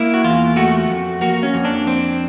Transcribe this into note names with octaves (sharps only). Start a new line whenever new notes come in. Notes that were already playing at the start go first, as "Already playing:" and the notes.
Already playing: A#3 E4
F#4
E2 F4
A3 F#4
F2
A#3 F#4
C#4
F2
D4
C4